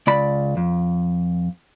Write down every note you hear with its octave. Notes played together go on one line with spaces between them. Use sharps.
C#2 D5 B5
F2